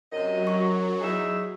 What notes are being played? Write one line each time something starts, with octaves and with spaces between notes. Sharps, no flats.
F#2 C3 F#3 D#5
C#6
E2 D#4 G#4 E5